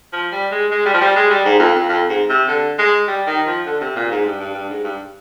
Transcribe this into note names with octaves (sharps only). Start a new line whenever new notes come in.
F3
G3
G#3
G#3
G3
F3
G3
G#3
G3
G#2
F2
F2
F2
G#2
C3
D3
G#3
G3
D#3
F3
D3
C3
A#2
G#2
G2
G2
G2
G#2
G2